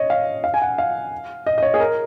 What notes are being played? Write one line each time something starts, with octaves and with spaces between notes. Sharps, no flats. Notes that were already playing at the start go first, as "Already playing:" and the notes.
Already playing: C#5 D#5
F5
F5
G#5
F#5
F5
D#5
D#5
C#5
G#4
A#4